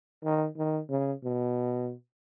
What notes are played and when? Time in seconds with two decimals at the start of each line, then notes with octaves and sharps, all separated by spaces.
0.24 D#3
0.57 D#3
0.90 C#3
1.24 B2